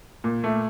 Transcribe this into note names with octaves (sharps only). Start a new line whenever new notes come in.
A#2
A3